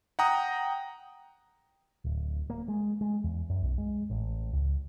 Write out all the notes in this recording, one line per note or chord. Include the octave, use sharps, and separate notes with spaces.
F#5 G5 A#5 D#6
D1
A#3
G#3
G#3
E2
F#2
B1
G#3
A1
C#2